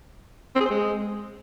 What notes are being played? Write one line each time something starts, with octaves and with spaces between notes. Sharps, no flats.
C4
G#4
C5
G#3